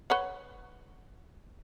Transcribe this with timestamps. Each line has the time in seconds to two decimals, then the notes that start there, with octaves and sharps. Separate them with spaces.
0.10 B4 C#5 F#5